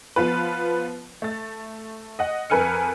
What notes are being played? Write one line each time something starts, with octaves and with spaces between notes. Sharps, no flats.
F3 B3 F4 B4
A3 A6
D#5 F#5
F2 A#4 B4 G#5 F6 C#7